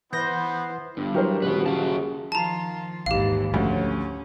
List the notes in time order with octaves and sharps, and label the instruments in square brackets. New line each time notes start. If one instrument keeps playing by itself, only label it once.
[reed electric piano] E3 B4 F#5 [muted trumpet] B3 [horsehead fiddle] E4 C5 [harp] G6 A#6
[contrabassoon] G1 [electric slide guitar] G2
[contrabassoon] E3 [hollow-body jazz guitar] F#3 [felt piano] G4 A#4 C5
[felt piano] D#1 [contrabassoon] C#2 [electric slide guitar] F#4 B4
[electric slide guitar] F#2 F#4 A5 [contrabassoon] C#3 [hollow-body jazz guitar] F4
[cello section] D#3 F3 F4 [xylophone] A5 A#5
[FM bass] A#1 [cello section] D#2 G#2 E3 [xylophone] G4 F5
[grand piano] D2 [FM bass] F3 [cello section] C#4